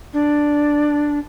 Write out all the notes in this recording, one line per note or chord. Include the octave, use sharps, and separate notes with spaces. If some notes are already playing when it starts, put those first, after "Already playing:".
D4